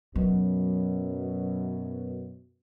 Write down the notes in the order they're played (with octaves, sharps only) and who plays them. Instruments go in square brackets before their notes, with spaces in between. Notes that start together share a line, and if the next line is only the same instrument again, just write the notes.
[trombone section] F#2 B2 [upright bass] F#3